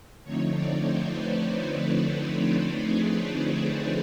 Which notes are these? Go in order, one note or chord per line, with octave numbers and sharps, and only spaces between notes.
D3 F3 A3 C4 D#4 C#5
D5
C5
B4
G#4